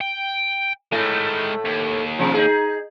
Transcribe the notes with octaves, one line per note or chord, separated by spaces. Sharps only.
G5
A2 G#3 A3 A#4
D#2
C3 F3
D#4 G#4